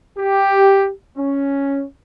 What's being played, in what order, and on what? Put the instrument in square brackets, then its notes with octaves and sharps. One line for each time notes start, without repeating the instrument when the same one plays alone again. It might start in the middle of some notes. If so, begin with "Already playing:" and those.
[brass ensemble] G4
C#4